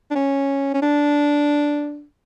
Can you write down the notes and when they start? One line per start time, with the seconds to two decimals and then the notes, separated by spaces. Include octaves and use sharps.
0.11 D4
0.15 C#4
0.74 C#4
0.82 D4